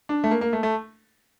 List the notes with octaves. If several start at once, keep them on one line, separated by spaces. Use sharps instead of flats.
D4
A3
A#3
A#3
A3
A3